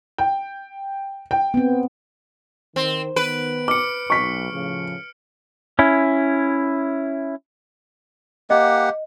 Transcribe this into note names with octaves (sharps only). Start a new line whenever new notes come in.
G5
G5
B3 C4
D#3 C4
D#3 B3 B4 D7
D6 F6 C#7
B1 C#6 B6
A2 C#3 F3
C#4 E4
A#3 G4 D#5 F#5